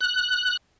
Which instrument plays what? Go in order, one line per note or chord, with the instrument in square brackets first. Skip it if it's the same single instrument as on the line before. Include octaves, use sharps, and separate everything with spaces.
[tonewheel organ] F#6